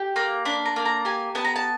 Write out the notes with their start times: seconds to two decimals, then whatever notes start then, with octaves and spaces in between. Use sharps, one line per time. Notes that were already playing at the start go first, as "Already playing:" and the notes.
Already playing: G4
0.16 A#3 A#5
0.45 D4 B5
0.65 A#5
0.76 A#3
0.85 A#5
1.05 G4 G#5
1.35 B3 A5
1.45 A#5
1.56 A5